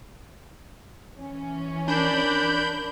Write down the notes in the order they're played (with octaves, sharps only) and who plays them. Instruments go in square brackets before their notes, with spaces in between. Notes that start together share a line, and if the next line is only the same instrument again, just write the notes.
[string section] E3 C#4
[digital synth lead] D4 [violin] A#4 D5 [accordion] B5 G6